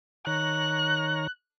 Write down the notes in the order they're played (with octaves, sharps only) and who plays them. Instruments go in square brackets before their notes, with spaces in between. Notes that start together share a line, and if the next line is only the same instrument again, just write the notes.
[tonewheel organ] D#3 C#5 A#5 [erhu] F#6